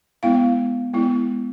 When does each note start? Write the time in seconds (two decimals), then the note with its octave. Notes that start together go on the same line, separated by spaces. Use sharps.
0.23 G#3 B3 E4 F5
0.93 G#3 B3 E4